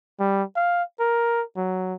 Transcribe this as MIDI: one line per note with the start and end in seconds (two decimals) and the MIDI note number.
0.19 0.43 55
0.55 0.83 77
1.00 1.43 70
1.56 1.94 54